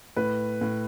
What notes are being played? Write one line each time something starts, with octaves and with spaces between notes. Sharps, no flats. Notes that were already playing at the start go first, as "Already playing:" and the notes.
A2 B4
A2